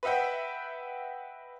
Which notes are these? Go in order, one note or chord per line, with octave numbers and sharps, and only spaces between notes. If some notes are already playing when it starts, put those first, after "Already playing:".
B4 D#5 E5 F#5 G5